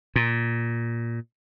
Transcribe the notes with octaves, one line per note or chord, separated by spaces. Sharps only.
A#2